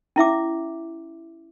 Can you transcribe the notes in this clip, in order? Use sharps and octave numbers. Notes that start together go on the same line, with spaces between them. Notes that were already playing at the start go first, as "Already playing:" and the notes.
C#4 E4 E5 D6